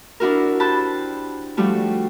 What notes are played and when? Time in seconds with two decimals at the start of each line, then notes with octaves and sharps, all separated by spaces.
0.20 D4 E4 F#4 A#4
0.60 G4 C5 A5 B5 F#6
1.57 F3 G3 A3 F#4